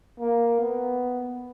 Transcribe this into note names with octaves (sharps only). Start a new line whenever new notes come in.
A#3
B3